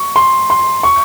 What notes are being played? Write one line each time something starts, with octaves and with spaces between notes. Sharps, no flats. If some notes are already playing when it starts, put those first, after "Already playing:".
Already playing: C#6
C6
C6
C#6